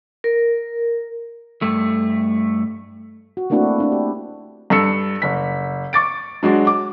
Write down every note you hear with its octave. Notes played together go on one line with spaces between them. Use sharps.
A#4
G2 A3
F#4
A3 A#3 C4 D4 E4 F#4
C4 D4 E4
G4
G2 A4 E6 C#7
F#1 B6
C#6 D6 A6 D7
F#3 G#3 D4 F#4
D6